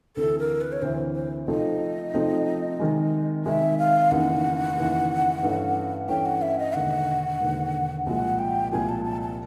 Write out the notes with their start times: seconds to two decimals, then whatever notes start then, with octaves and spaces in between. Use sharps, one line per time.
0.17 D2 C3 E3 A4
0.39 A#4
0.61 B4
0.72 C#5
0.82 D2 C3 E3 C5
1.15 C5
1.48 C3 F3 A3 C4 D#4 D#5
2.14 C3 F3 A3 C4 D#4
2.80 C3 D#3 G#3
3.46 C3 D#3 G#3 E5
3.79 F5
4.11 F1 D#2 C#3 E3 F#5
4.77 F1 D#2 C#3 E3
5.43 G2 E3 A3 C#4
6.08 G2 E3 A3 C#4 G5
6.26 F#5
6.42 E5
6.59 D#5
6.74 E1 D#2 D3 F#5
7.40 E1 D#2 D3
8.06 C2 A#2 F3 G#3 F#5
8.39 G5
8.72 C2 A#2 F3 G#3 G#5
8.89 A5
9.05 A5
9.21 A5